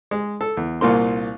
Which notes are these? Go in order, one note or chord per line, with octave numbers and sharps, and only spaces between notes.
G#3
A4
E2
C2 A#2 A#3 C6